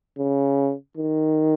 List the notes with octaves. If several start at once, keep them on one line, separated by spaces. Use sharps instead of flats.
C#3
D#3